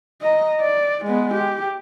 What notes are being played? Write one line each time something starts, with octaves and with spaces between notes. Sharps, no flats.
D#5 A#5
D5
G#3 B3
G4